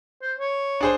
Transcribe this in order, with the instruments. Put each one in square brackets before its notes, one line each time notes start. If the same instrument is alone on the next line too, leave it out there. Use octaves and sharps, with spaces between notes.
[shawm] C5
C#5
[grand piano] D4 G#4 C5